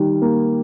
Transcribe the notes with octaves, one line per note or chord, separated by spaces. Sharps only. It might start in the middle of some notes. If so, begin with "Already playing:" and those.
Already playing: D#3 G3
A#3